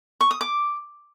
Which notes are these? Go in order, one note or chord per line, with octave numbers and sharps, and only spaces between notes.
C#6
D#6
D6